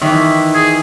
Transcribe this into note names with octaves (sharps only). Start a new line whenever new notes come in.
D#3 E3 E5
G#4